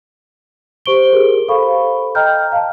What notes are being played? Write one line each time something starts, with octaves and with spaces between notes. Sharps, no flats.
G4 C5 C#6 D7 G7
G4 G#4 A#4
A4 C5 F5 B5 C#6
D#5 G5 A#5 F6 G6
F5 A5